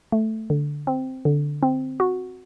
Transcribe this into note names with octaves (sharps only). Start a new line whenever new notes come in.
A3
D3
C4
D3
C4
F#4